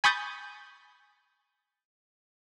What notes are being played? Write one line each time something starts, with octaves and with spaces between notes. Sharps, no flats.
G#5 B5 C#6 D#6 G6 A6